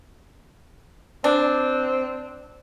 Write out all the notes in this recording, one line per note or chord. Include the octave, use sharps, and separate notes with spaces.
C4 D4